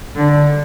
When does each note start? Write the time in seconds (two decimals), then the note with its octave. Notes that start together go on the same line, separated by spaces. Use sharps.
0.16 D3